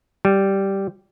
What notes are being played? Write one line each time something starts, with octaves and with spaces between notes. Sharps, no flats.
G3